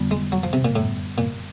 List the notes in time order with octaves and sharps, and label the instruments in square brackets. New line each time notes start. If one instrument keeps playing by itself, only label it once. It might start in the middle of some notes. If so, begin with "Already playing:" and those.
Already playing: [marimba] F2 D3 G3 B3
[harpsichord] G#3
F#3
F3
C3
A#2
[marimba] F#2 D3 G3 B3 [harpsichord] A2
[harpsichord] A#2